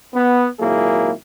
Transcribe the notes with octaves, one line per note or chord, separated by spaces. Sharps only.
B3
G#1 A#2 F#3 A#3 E4 G#4